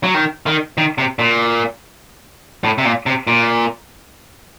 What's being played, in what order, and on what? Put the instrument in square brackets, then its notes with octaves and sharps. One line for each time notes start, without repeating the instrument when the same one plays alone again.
[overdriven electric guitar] F#3
D#3
D#3
D#3
C3
A#2
A2
C3
A#2
C3
A#2